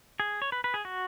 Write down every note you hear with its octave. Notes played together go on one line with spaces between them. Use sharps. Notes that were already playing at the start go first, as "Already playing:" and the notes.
G#4
C#5
B4
B4
G#4
F#4